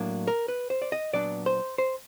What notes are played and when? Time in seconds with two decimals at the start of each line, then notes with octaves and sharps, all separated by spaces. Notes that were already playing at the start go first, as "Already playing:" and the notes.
Already playing: A2 F#3 A#3 D4
0.27 A#4
0.48 B4
0.70 C5
0.82 D5
0.92 D#5
1.13 A#2 F#3 B3 D4 D5
1.46 C5
1.78 C5